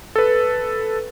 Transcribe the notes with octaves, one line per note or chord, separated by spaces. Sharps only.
A4 B4